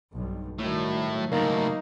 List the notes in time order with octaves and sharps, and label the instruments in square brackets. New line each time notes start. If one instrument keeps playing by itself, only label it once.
[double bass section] B1 G2
[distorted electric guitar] A2 [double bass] D#3 G3 [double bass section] F#3
[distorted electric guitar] C#2 A2 [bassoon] A#3 [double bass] D#4